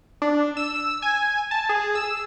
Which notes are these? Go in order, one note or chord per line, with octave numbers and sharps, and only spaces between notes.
D4
E6
G#5
A5
G#4
E6